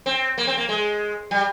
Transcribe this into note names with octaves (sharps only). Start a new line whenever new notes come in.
C4
A#3
C4
A#3
G#3
G3